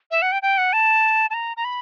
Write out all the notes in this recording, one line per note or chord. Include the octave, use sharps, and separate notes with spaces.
E5
F#5
G5
G5
F#5
A5
A5
A#5
A#5
B5